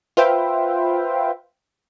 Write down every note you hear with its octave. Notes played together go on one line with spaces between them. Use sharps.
F4 B4 C5 E5 G5